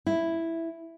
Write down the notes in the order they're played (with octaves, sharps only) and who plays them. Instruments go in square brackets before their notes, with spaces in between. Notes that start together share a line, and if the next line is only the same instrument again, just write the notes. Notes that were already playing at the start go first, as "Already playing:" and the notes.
[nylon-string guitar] E4